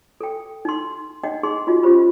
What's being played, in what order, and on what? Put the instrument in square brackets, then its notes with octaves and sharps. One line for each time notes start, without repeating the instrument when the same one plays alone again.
[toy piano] A4 G5
D#4 C6
D4 D#4 D#5 F#5 G5
D#4 G#4 C6
D#4 F4 F#4 D#5
C#4 F4 G4 C5 B5